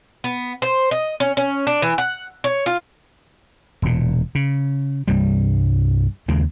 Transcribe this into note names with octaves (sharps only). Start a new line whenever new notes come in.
B3
C5
D#5
C#4
C#4
D4
E3
F#5
C#5
F4
E1 A#2
C#3
C2 G2 G3
D#2 C#3 G#3 A#3